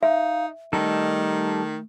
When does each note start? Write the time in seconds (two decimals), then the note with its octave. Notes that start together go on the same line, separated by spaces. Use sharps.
0.03 D#4 E5 F5
0.73 D#3 G3 A3 D#4 A4